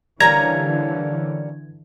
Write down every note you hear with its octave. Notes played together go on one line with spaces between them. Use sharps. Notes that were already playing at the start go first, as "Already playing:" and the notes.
D3 E3 G3 A#3 C#4 A#5 G#6